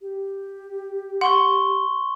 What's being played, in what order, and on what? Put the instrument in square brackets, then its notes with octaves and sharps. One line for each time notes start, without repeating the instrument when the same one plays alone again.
[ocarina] G4
[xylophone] F#5 [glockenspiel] C6 C#6 G7